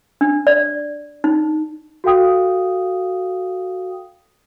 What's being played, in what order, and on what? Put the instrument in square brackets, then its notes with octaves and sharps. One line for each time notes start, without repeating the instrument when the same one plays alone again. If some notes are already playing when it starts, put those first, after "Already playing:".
[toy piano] D4
D5
D#4
[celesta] F#4 A4 F5 G5 D#6